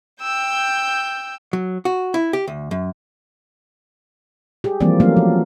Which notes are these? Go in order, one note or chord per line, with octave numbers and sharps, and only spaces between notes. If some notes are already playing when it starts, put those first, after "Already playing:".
G5 E6 G6
F#3
F#4
E4
G4
D2
F#2
G4 G#4
E3 F3 G3 A#3 C4 D5
F#3 A3 A#3 C#4 F5
F3